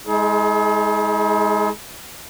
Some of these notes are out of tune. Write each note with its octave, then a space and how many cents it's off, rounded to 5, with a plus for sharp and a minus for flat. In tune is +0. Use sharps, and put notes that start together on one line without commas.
G#3 +0 E4 -45 G#4 +40